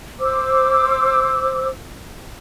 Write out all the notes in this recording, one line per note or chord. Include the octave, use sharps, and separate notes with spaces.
C5 D6 E6